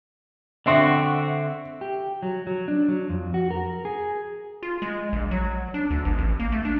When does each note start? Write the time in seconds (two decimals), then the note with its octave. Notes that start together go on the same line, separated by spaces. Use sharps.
0.66 D3 C4 F#4 E5 C#6
1.81 G4
2.23 F#3
2.47 F#3
2.68 D4
2.88 F#3
3.09 F2
3.34 F#4
3.51 A#4
3.85 G#4
4.63 F4
4.82 G#3
5.13 A#1
5.31 F#3
5.74 D4
5.90 D2
6.05 G#1
6.19 A1
6.40 A#3
6.52 A3
6.65 D4